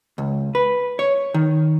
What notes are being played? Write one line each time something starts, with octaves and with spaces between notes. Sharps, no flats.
C#2
B4
C#5
D#3